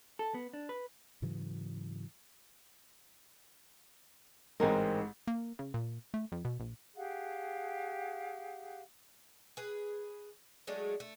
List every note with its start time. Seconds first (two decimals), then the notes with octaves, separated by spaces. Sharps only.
0.19 A4
0.34 B3
0.53 D4
0.69 B4
1.22 G#2 C#3 E3 F#3
4.60 A1 G#2 G#3 C4 D#4 A#4
5.27 A#3
5.59 C#3
5.74 A#2
6.14 A3
6.32 F2
6.45 B2
6.60 A#1
6.96 G4 G#4 F5 F#5
9.57 G#4 B4
10.67 F#3 G#3 A3 D4
11.00 A3